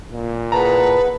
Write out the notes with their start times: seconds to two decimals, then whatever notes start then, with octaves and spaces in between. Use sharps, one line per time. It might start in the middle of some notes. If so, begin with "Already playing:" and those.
0.12 A#2
0.52 E4 G#4 B4 F#5 A5 A#5